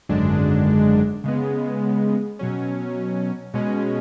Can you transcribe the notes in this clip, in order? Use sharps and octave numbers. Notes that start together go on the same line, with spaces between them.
G#1 F#2 D3 G#3 D4
C#3 G#3 B3
B2 F#3 C#4
B2 G#3 C#4